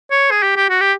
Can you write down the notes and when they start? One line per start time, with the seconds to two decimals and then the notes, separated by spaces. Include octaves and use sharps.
0.11 C#5
0.31 G#4
0.43 G4
0.56 G4
0.70 F#4
0.81 G4